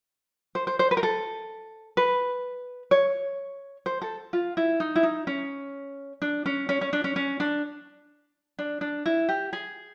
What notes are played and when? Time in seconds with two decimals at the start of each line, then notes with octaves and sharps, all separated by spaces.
0.55 C5
0.67 C5
0.79 C5
0.91 B4
0.97 A#4
1.03 A4
1.97 B4
2.91 C#5
3.86 C5
4.02 A4
4.33 F4
4.57 E4
4.80 D#4
4.96 E4
5.03 D#4
5.27 C#4
6.22 D4
6.46 C#4
6.69 C#4
6.81 C#4
6.93 D4
7.04 C#4
7.16 C#4
7.40 D4
8.59 D4
8.81 D4
9.06 E4
9.29 G4
9.53 G#4